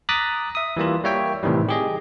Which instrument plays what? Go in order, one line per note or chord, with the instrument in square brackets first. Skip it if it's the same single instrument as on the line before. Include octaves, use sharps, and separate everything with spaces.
[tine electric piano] A#5 D6 D#6 F#6 A6 B6
E5 D#6
E3 G3 A#3 F4
G3 A#3 C#5 E5 G5
A2 C3 D#3 E3 G3
G4 G#4 D#5